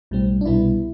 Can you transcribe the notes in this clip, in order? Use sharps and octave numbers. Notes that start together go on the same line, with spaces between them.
B1 A2 G3 C4
D4
C2 B2 G3 B3 E4